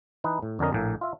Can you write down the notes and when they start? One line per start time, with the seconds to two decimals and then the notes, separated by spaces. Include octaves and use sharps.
0.24 E3 D#4 B4
0.42 A2
0.59 F2 D3 C#4 A#4 D#5
0.73 A#1 A2 A#3
1.01 F4 E5